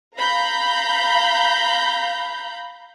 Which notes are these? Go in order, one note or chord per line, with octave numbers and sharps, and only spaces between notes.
F5 A#5 B5 G6